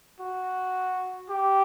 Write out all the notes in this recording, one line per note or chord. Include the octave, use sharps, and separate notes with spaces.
F#4
G4